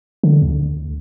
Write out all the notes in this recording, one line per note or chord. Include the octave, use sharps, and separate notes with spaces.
D3
D2